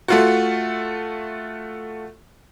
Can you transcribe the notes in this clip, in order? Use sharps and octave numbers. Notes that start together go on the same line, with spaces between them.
A3 F4 F#4